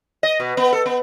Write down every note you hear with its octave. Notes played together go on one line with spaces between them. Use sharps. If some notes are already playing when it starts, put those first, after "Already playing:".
D#5
B2
B3
A4
B3